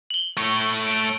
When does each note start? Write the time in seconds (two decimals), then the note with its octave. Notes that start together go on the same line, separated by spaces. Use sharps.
0.10 F#7 G7
0.37 A3 C#5
0.87 D7